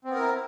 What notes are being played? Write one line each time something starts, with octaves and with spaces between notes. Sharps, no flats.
B3 C4 E4 A#4